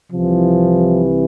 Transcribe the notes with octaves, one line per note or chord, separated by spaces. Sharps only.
C2 C3 E3 F3